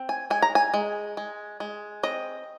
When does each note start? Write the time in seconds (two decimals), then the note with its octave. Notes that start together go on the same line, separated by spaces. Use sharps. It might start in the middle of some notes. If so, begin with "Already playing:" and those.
Already playing: C4
0.09 G#5
0.30 G#3 G#5
0.42 A#5
0.55 G#5
0.74 G#3
1.17 G#3
1.60 G#3
2.03 C4 D#5